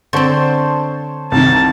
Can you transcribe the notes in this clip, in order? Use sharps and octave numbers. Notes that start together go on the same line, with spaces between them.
D3 C4 C5 C#5 A5
C2 D#3 A5